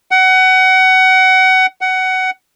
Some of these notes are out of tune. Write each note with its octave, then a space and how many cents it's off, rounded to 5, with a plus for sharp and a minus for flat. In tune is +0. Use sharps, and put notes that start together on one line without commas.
F#5 +25
F#5 +20